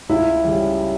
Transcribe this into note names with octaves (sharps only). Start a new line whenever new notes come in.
C#2 E4
C#3 G3